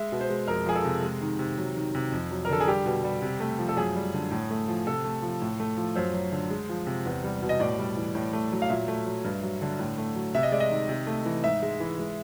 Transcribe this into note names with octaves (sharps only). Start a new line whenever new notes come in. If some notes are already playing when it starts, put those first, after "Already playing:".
Already playing: G#3 E5
B2
C5
G#3
F2 A#4
F3 G#4
A4
C3
G#3
D#3
C3
F#3
D#3
C3
F2
F#3
A#4
D3 A4
G#4
G3 G4
B2
G3
C3
A3
F3
A4
F#2 G#4
G3
D3
A2
A3
F3
C3 A4
A3
F3
A2
A3
F3
F#2 C5
F#3
D3
G#3
F3
C3
E2
G3
B2
D#5
A2 D5
G3
E3
A2
A3
F#3
F5
A#2 E5
A3
F#3
G2
F#3
D3
A2
A3
F#3
C3 E5
D#5
G#3 D5
D#5
D#3
C3
A3
E3
G#2 E5
G#3
E3
G#3